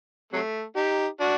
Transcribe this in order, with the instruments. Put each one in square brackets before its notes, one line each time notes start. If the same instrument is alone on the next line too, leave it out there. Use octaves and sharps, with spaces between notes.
[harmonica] C3 F#3 A3
D#4 G4
D4 F#4